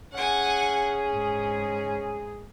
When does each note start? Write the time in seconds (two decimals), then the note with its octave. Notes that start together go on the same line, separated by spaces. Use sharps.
0.13 C#4 G#4 F#5 G#5
1.10 G#2